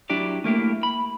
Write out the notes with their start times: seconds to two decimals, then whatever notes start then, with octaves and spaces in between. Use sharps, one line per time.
0.10 F#3 D4 E4 G4 D5
0.44 A3 A#3 E4 G4
0.83 B5